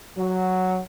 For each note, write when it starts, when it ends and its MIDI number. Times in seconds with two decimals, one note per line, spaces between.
0.17 0.79 54